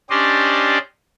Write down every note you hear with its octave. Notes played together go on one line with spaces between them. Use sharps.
C#4 D4 G4 C5 D5 D#5